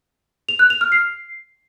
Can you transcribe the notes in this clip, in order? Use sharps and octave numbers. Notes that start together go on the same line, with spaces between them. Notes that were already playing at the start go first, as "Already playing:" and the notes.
F7
F#6
F7
F6
C7